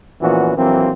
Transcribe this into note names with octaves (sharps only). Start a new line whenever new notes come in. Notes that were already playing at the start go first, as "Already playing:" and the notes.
A#2 E3 F3 B3 C#4 F#4
A#1 E3 F#3 A#3 C4